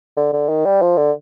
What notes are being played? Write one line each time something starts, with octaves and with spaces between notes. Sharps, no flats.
D3
D3
D#3
G3
F3
D3